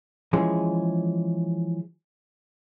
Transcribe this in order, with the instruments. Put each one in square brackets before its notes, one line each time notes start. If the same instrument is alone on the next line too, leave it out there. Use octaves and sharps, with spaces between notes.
[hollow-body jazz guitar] E3 F3 G#3 C#4 G#4